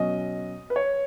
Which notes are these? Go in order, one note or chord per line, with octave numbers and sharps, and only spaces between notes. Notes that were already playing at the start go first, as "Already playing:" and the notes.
Already playing: B2 F#3 C#4 D#5
B4
C#5